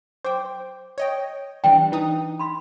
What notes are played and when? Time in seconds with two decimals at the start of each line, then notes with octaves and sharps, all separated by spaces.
0.25 C5 G5 D6
0.98 C#5 D#5 G5
1.64 E3 G3 D4 G5
1.92 E3 D#4 D#6
2.39 B5 C6